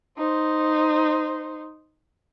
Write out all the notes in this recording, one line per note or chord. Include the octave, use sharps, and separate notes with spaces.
D#4 C5